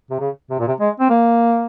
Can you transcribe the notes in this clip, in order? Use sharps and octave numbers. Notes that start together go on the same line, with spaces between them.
C3
C#3
C3
A#2
C3
G#3
C4
A#3